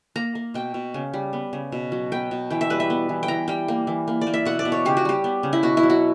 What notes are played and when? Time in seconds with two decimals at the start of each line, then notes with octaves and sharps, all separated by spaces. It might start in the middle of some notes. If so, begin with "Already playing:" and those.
0.16 A#3 A#5
0.35 A#3
0.54 B2 G5
0.74 B2
0.94 C#3
1.14 G3
1.33 B3
1.53 C#3
1.72 B2
1.92 F#3
2.12 B3 G5
2.31 B2
2.50 E3 G5
2.61 E5
2.70 G3 B4
2.80 E5
2.90 B3
3.09 E3
3.23 G5
3.28 E3 A#5
3.48 G3 G5
3.68 A#3
3.87 E3
4.08 A#3
4.21 D5
4.27 A#3
4.34 E5
4.45 B2 F#5
4.59 D5
4.65 B2
4.72 C#5
4.85 C#3 G4
4.97 F#4
5.05 G3 G4
5.24 B3
5.43 C#3
5.53 E4
5.63 B2 F#4
5.77 E4
5.83 F#3
5.90 F#4